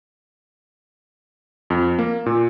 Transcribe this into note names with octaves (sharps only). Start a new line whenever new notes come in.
F2
A#3
A#2